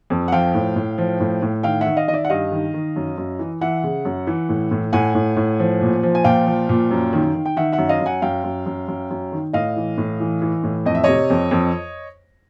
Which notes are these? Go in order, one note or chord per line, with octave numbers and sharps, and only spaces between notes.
F2
F#5
F3 F5 G5
A2
A2
F3
A2
A2
D#3 F5 G5
E5 F#5
D#3
D#5 F5
D#3 D#5
D5 E5
F#5
G2 D#5 F5
D#3
D#3
F#2
F#2
E3
E3 E5 F#5
C#3
F#2
E3
A2
A2
A2 F#5 G#5
A2
A2
F3
A#2
F3
G#5
A#2 F5 G5
F3
A#2
F#2
D#3
D#3
G5
D#3 E5 F#5
E5 F#5
F#2
D#5 F5
F#2
F#5 G#5
F#2 F5 G5
F#2
F#2
F#2
F#2
D#3
A2 D#5 F5
E3
A2
E3
E3
A2
F2 D#5
E5
C3 C#5 D#5
F2
F2